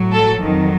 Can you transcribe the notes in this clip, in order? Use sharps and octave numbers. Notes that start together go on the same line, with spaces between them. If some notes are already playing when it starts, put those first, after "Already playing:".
Already playing: A2 F#3
A4
F2 D#3 F#3